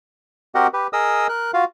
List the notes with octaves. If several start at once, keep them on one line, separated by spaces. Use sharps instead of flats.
C4 F#4 G4 A#4 D#5 F#5
G4 B4
G#4 A#4 D#5 D#6 E6
A#4 F#6
F4 F#4 F5